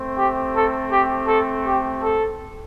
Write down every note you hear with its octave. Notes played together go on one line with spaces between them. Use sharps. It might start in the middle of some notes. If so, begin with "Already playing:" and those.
Already playing: A3 C4
G4
A4
G4
A4
G4
A4